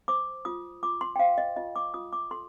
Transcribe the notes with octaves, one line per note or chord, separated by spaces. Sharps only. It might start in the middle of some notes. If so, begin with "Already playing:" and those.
C5 D6
F4 D#6
F4 D6
C6
G5
C5 F5
D#5
F4 D#5
D6
F4 D#6
D6
A4 C6